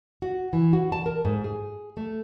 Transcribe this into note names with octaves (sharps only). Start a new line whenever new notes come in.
F#4
E3
F#4
A5
A#4
G#2
G#4
A3